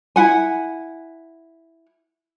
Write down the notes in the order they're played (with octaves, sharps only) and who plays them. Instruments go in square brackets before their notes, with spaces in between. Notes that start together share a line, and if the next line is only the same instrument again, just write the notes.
[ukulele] E4 F#5 G#5